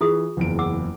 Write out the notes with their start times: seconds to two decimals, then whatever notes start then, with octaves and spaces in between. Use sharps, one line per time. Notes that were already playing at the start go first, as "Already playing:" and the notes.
0.01 E3 F4 G#4 D#6
0.37 F#1 E2 D7
0.59 F#5 D6 E6